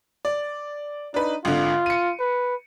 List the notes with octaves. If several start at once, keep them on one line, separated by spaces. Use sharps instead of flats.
D5
D4 D#4 B4
G#1 D3 F4
C#7 D#7
B4